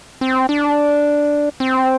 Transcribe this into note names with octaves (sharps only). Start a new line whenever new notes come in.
C4
D4
C4